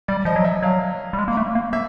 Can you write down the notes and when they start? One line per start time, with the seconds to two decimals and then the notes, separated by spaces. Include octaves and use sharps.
0.08 G3 D5
0.25 F3 D#5
0.36 F#3
0.44 E5
0.62 F#3 F5
1.13 G3
1.19 G#3
1.28 A#3
1.37 A3
1.55 A#3
1.73 A#3 E5